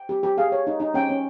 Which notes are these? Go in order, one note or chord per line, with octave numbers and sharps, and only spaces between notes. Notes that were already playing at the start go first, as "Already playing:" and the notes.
Already playing: G5
G4
G4
G#4 F5
C#5
D#4
D#4
C#4 G5
C#4